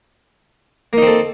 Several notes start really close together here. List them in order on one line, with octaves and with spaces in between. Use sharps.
A#3 D#4 C4 A4